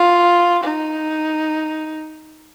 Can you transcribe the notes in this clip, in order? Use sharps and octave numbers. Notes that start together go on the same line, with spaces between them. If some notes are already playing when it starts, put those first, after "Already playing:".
Already playing: F4
D#4